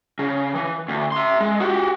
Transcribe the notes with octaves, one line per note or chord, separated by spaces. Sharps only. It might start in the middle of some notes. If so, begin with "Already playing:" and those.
C#3
E3
D2
E5 C6
G#3
F#4 G4